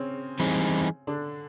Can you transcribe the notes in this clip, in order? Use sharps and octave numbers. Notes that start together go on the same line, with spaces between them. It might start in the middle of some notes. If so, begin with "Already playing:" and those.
Already playing: C#3 C4 C#4
E3 G3 C4 D#4 G#4
D3 D4